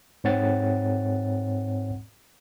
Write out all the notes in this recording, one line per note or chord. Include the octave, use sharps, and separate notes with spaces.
G#2 C4 C#5 F#5 A6